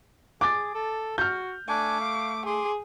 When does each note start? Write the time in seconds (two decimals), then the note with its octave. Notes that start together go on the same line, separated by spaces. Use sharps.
0.41 G#4 D6 A6
0.75 A4
1.18 F#4 F6 G6
1.69 A3 D4 G#5 D6
2.01 F5
2.46 G#4 C6 D6